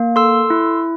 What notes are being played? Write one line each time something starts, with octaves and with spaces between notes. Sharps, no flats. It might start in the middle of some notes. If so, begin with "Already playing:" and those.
Already playing: A#3
A4 C6 E6
E4